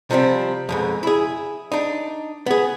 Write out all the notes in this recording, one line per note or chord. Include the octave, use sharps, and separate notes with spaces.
C3 F3 G3 C4
F2 G#2 B2
E4 G#4
D4 D#4
B3 G#4